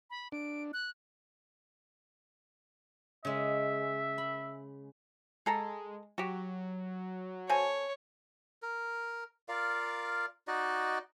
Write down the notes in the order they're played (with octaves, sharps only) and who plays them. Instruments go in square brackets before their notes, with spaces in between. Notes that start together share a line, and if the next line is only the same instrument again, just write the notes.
[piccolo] B5
[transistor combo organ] D4 [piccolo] D7
[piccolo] F#6
[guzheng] C#3 G#3 [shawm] E5
[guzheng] B5
[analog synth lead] G#3 [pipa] G#4 A4 A#5
[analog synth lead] F#3 [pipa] F#4 G4
[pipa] C4 A4 G#5 [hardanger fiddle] C#5
[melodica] A#4
F4 A#4 D5 F5
D#4 F#4 D5 D#5